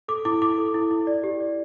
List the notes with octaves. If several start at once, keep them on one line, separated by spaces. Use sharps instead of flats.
A4 D6
E4 D6
E4 D6
A4
E4
E4
D5
G4
D5